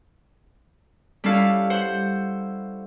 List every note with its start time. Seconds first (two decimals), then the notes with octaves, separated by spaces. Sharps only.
1.24 G3 C#4 E4 A4 F5
1.70 C5 F#5